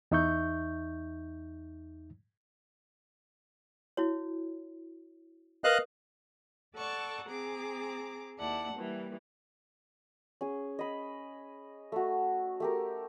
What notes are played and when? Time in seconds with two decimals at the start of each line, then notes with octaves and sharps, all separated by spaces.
0.11 E2 D#4 E5 C#6 G6
3.97 E4 F#4 C#5
5.64 A#4 B4 D#5 F5 D#6 F#6
6.76 A4 D5 F#5 A5 C#6
7.29 C4 G#4 A#5 D6
8.38 D#2 E4 D5 F#5 A5
8.73 E3 G3 A#3
10.41 C#4 G#4
10.79 D#5 B5
11.92 A3 F#4
12.60 A3 G4 A#4